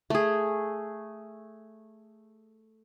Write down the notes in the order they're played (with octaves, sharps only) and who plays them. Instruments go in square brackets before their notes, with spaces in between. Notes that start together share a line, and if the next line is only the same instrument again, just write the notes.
[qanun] A3 G#4